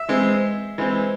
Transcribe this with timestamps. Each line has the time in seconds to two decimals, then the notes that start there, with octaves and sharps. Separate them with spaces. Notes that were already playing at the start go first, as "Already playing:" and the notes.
Already playing: E5
0.08 E3 G#3 C4
0.78 E3 G#3 C4